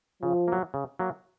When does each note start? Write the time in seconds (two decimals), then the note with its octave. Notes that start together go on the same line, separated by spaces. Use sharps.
0.22 C#3 F3
0.48 F#3 A#3
0.74 C#3
0.99 F#3 A#3